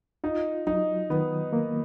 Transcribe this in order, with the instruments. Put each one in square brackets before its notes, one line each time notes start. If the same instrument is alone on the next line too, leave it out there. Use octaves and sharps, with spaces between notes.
[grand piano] D#4 [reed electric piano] F4
[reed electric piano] F#3 [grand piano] D#4
[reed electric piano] D#3 [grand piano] B3
[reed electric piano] A#3